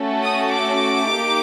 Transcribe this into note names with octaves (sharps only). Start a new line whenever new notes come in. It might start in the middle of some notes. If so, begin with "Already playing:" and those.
Already playing: A3 C#4 F#4 A4
D#6
D6
A#3 D#4 G4